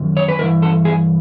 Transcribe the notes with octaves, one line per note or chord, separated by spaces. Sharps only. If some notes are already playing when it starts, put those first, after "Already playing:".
Already playing: F#2 D#3
C#5
B4
G2 E3 A#4
A4
G#4